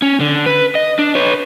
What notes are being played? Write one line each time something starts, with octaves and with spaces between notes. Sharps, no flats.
C#4
D3
B4
D#5
D4
B4 C#5